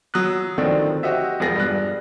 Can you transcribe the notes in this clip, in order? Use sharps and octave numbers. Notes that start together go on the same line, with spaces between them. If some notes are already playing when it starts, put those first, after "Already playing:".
F#3 D#6 E6 F#6
D3 D#3 F3 A3 C4 D4
F#4 G4 C5 D#5 E5
E1 F3 B3 G#4 A#6
G2 F#6